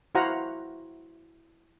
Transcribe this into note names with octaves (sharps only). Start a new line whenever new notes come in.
E4 F#4 C5 F5 F#5 A#5